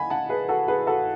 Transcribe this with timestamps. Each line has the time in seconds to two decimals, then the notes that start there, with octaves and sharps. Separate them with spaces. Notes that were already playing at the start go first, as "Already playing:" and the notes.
Already playing: D#3 D#5 F#5 G#5 B5
0.10 F#5 A5
0.29 G#4 B4
0.49 F#4 A4
0.68 G#4 B4
0.87 F#4 A4